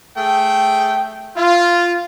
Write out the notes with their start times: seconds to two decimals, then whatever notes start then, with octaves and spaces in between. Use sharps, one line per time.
0.17 A3 G#4 G5
1.36 F4